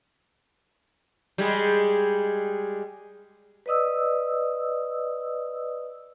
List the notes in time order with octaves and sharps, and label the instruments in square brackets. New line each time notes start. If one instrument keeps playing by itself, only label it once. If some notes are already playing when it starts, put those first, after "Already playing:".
[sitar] G3 G#3 G#4
[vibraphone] B4 D5 D#5 D#6 E6